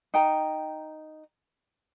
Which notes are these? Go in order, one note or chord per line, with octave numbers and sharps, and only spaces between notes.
D#4 G5 A#5